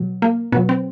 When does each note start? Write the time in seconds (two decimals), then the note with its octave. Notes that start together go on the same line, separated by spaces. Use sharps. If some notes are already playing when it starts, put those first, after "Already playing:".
Already playing: B2 F#3
0.22 A#3
0.52 B2 F#3 B3
0.69 C4